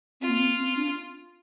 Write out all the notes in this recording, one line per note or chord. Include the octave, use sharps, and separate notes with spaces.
C4 F4
A#3
C4
C4
C4
D4